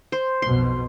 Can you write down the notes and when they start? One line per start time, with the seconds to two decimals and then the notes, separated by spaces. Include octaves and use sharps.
0.12 C5
0.42 B1 F2 B2 C6